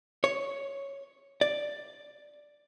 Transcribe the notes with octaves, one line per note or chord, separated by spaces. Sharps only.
C#5
D5